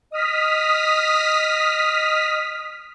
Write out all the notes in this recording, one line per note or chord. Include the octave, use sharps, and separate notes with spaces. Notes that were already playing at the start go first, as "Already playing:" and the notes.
D#5 D#6 F6 B6